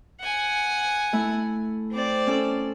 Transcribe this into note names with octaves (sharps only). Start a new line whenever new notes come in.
F#5 G#5
A3 E4
C4 D5
C#4 A4